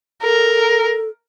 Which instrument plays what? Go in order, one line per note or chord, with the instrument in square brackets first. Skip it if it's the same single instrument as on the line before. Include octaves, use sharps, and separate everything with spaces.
[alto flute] A4 [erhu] A#4